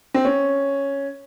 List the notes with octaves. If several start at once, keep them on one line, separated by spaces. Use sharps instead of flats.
C4
C#4